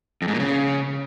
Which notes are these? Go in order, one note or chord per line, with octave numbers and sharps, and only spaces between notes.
F2
G#2
A#2
C#3